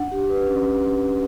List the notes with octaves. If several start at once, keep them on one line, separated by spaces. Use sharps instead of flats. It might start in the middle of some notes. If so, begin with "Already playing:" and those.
Already playing: D4 F#5
G4
B4
C#4